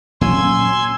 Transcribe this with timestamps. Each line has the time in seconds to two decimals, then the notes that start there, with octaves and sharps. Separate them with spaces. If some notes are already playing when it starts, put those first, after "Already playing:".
0.21 A#2 F#3 C#4 G#5 C6 E6 G#6